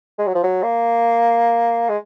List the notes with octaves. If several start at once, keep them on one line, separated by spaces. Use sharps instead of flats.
G#3
F#3
F3
F#3
A#3
G#3